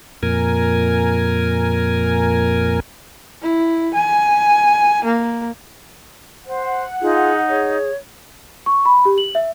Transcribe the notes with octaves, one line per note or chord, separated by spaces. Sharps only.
F2 A#2 A#4 G#5
E4
G#5
A#3
C5 F#5
D#4 F4 G#4
G#4 C#5
C#6
B5
G4
F#7
E5